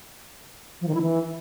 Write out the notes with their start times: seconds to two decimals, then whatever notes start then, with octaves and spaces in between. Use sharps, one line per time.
0.81 F3
0.88 D#3
0.95 E4
1.01 E3